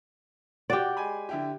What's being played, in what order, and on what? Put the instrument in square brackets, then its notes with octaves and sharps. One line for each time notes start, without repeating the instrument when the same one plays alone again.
[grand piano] F#4 [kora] G4 D5
[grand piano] G#3 G#5 B5
D3 E4 G4